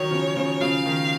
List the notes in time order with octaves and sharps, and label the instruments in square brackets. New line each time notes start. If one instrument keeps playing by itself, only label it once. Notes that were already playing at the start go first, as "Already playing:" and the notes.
Already playing: [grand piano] D#3 F#3 [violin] C#5
[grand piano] C#3 F3
F#3
C#3 F3
[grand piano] C#3 F3 [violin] F5
[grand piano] D#3